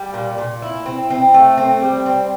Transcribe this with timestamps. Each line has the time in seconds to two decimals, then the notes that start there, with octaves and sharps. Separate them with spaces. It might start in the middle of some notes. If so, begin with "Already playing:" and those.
Already playing: G3
0.14 A#2
0.38 A#2
0.62 E4
0.86 C4
1.10 C4
1.34 A3
1.57 C4
1.82 G3
2.06 C4